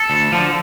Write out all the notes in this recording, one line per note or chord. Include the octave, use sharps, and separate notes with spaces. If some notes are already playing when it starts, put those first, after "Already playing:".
Already playing: A4
D2
D3 F3